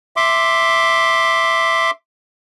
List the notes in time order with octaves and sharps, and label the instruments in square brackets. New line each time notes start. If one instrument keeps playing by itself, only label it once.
[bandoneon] E5 C6 D6